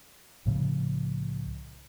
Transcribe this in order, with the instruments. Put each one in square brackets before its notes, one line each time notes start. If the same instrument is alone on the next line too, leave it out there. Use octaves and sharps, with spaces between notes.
[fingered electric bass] C2 A2 C#3 F3